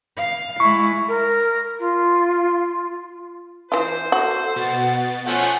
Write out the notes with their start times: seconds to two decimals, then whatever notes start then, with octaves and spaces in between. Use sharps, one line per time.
0.17 F5
0.60 G#3 E4 C#6
1.08 A#4
1.79 F4
3.72 E3 F4 C5
4.12 F#4 A4
4.56 B2 F#5 A6
5.26 F3 A3 C#4 F#5 G#5